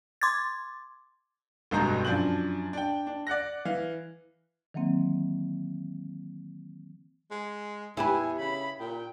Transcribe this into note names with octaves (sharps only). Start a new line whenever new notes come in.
C6 D6 G#6 A6
F1 G2 B2 G#3 A#5 G6
F#2 F3 D4 G6 F#7
D4 G5
D4
D5 F#5 F#6 A#6
E3 F5
D#3 E3 F#3 A#3 C4
G#3
E2 E4 G4 B4 G#5
C#3 B5
A#2 G5